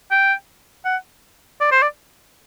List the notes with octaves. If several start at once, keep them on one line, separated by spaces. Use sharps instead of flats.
G5
F#5
D5
C5
D5